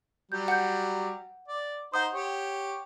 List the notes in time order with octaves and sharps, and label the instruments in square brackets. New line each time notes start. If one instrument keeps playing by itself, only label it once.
[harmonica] F#3 G3 [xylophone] G6
[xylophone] F#5 G6
[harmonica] D5
[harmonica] D#4 C5 [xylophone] F#5 D#6
[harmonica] G4 C#5